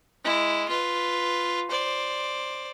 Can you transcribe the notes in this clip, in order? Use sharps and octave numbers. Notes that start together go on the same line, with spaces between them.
G#3 E4
F4 B4
C5 D5